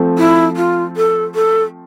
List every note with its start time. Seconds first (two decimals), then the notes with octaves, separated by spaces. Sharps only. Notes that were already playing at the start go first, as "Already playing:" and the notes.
Already playing: F3 A3 C4
0.18 E4
0.56 F4
0.96 A4
1.35 A4